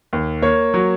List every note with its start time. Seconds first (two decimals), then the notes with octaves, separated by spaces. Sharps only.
0.13 D#2
0.42 A#3 C#5
0.74 F#3